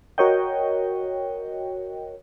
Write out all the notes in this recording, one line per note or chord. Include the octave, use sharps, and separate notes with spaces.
F#4 A#4 C#5 D#5 G5